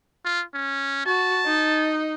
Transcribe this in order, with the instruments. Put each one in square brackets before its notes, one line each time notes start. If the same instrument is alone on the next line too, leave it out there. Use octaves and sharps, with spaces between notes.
[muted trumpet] F4
C#4
[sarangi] F#4 [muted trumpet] A5
[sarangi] D#4